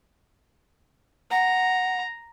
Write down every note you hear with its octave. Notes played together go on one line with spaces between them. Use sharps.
F#5 A#5